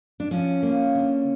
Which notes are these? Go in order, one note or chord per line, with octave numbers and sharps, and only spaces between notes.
D4
F3 C#4
A#3
D3